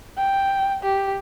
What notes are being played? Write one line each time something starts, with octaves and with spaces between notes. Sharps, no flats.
G5
G4